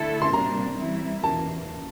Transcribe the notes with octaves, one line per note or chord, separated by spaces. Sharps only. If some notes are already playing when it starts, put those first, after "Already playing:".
Already playing: D3 A3 E4 A4
C6
C3 G3 A#3 D4 A#5
E3 G3 C4 E4
E2 E3 A#3 A5